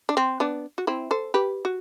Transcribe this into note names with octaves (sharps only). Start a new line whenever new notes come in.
D4
C4
B3 D4
F#4
C4 E4
A4 C5
G4 B4
F#4